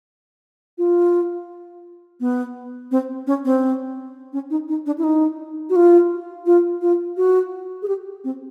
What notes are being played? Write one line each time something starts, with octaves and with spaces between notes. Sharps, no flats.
F4
B3
C4
C#4
C4
C#4
D#4
D#4
D4
E4
D#4
F#4
F4
F4
F4
F#4
G#4
G4
C4